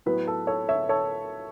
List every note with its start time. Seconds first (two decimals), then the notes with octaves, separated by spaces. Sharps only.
0.06 A2 F#3 B3 B4
0.27 A4
0.47 A4 C#5
0.69 C#5 E5
0.89 A4 C#5